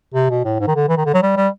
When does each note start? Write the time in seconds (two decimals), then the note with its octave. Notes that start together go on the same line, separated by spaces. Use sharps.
0.14 C3
0.30 B2
0.44 A2
0.60 G#2
0.67 D#3
0.75 D3
0.89 E3
0.97 D#3
1.06 D3
1.14 F#3
1.22 G3
1.37 G3